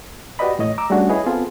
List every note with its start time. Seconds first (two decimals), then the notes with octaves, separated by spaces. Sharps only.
0.39 F#4 G4 B4 D5 D#5 B5
0.58 E2 A2 C#5 D#5
0.78 A#5 D6 E6
0.90 G3 A3 C#4 D4 F#4 G#4
1.09 E4 G#4 B4 C#5 D#5
1.26 B3 C4 F4 G#4 A4